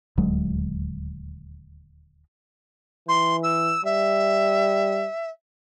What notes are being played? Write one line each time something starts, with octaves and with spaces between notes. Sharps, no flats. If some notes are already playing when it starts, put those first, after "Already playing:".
D#1 D2 F#3 G#3
E3 C6
E6
G3 E5